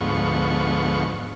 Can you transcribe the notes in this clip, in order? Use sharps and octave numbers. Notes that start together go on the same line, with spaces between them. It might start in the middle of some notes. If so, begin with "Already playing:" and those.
D2 G#2 F3 B3 C#6